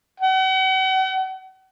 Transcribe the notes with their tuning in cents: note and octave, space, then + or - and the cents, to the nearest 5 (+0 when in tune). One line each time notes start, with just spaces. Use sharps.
F#5 +40